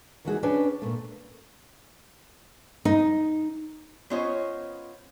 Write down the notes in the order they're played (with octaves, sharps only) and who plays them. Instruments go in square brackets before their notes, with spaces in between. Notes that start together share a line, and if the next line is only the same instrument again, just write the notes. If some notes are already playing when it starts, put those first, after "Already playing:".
[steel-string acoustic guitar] D#3 E3 F#4 G#4
C#4 D4 B4 G5
A#2 A3
[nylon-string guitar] D#4
[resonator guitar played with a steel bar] B3 C#4 F4 C5 C#5 D#5